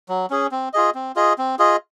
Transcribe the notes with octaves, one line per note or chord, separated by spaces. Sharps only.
F#3
C#4 G#4
C4
F4 G#4 D#5
C4
F4 G#4 D#5
C4
F4 G#4 D#5